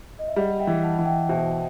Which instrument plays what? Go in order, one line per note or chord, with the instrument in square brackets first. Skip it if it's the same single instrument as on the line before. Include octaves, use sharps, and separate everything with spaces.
[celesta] D#5
E5
[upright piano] G3 [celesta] D#5 F#5
[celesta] E5 G5
[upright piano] E3
[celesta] F#5 A5
[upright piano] E3 [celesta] F#5
[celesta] E5 G5
[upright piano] B2 [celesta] C5 E5